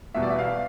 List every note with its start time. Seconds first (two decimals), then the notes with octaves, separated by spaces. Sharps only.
0.14 E2 B2 G3 E5
0.23 D5
0.30 E5
0.38 F5